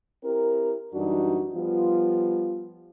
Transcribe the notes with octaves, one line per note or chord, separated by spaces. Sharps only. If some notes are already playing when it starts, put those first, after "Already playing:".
C4 E4 G4 A#4
F#2 E3 G3 D4 D#4 F#4
F3 G3 B3 F4